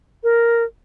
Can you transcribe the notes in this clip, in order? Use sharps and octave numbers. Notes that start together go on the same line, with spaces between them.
A#4